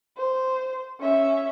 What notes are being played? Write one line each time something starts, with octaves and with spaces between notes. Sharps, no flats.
C5
C#4 E5